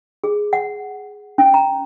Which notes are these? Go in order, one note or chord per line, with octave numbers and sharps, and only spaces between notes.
G#4
F#5
C#4
A#5